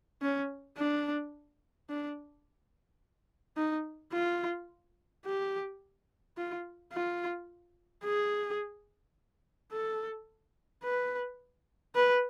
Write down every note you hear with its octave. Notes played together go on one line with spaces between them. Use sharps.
C#4
D4
D4
D#4
F4
G4
F4
F4
G#4
A4
B4
B4